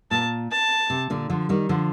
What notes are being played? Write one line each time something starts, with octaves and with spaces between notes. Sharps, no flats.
A#2 A5
A5
C3
A#2 D3
D3 F3
D#3 G3
D3 F3